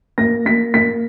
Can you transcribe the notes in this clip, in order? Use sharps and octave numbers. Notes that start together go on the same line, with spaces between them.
A#3 A#6
A#3 B6
A#3 B6